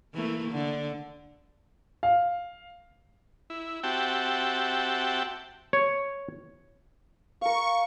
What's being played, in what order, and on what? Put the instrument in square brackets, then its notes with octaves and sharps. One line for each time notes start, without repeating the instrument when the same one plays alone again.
[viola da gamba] E3 A3 A#3
D3
[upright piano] F5
[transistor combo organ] E4
C4 F#4 G4 E5 G5 A5
[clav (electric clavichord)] C#5
[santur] A#4 F5 [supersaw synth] C#6